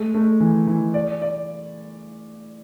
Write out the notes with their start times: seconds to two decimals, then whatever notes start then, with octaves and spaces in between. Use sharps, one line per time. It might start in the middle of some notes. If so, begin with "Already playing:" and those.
Already playing: G#3 A3
0.15 A3
0.40 E3
0.67 E3
0.94 D5
1.22 D5